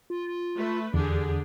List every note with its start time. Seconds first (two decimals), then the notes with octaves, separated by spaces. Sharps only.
0.10 F4
0.56 A3 B4
0.94 E2 D3 D4 G4 G#4